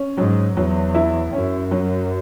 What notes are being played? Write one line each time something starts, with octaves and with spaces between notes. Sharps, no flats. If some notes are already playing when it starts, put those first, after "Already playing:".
Already playing: C#4
G#2 F#3
E2 F#3
E4
F#2 C#4
F#3